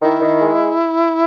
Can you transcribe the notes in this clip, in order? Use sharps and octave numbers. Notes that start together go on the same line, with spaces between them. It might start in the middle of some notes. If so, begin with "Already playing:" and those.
D#3 E4
D#3
G#3